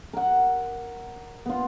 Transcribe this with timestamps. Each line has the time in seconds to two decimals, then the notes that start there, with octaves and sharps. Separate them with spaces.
0.13 A#4 F#5
1.46 B3 F4